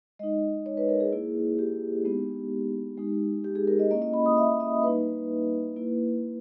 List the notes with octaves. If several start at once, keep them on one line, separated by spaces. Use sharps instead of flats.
G#3 D#4 D#5
C#5
B4
A#4
G#4
A#3 E4
G4
G#3 B3 D#4
G#3 D#4
G4
G#4
A#4
D#5
A#3 C#4 E4 D#5
D#5
B5
D#6
E5
D#5
G3 A#3 D#4 B4
A#3 E4